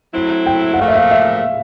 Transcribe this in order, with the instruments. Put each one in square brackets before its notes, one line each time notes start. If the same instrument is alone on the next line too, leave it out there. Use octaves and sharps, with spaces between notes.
[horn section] F#3 A3 C4 E4
[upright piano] G5
F#5
[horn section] A#2 F3 A3 [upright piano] F5
[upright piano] E5
F5
E5